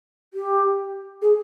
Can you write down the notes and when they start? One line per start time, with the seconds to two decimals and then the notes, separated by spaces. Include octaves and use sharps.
0.34 G4
1.22 G#4